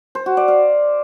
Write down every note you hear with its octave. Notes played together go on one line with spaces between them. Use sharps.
C5
F#4
D5
F5